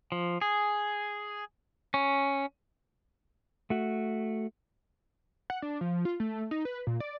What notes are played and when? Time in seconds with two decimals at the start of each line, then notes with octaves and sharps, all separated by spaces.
0.12 F3
0.41 G#4
1.94 C#4
3.70 A3 F#4
5.50 F#5
5.62 D4
5.81 F3
6.05 F4
6.20 A3
6.51 D#4
6.65 B4
6.87 A#2
7.00 D5